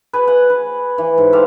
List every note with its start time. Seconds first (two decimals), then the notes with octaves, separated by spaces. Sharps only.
0.13 G#4 B4
0.28 F#5
0.50 B4
0.98 E3
1.18 G#2
1.32 G4 A4 C5 F5